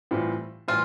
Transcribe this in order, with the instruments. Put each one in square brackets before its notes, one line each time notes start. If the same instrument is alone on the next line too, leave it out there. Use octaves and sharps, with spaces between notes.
[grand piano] A2 E3 G3 C4 F4
[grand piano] A2 E3 G3 [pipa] F4